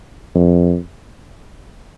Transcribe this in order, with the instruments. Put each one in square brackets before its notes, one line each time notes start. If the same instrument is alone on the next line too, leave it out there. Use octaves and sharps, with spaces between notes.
[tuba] F2